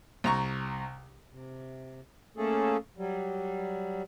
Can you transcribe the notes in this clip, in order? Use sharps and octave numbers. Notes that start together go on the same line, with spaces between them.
C2 A#5 C#6
C3
A3 A#3 C#4 G#4 A4
F#3 G3